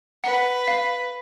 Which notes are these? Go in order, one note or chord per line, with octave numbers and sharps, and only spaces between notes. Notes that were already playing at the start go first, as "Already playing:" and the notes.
B4 F#5
F5